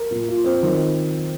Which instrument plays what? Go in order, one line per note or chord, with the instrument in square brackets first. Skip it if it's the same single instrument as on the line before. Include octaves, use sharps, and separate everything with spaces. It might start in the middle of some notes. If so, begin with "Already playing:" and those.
Already playing: [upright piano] A#4
A#2
F4
C4
D#3